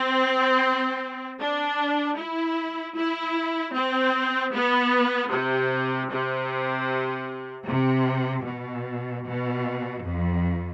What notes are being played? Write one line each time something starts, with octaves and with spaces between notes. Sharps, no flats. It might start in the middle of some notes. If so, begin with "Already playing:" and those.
Already playing: C4
D4
E4
E4
C4
B3
C3
C3
C3
B2
B2
F2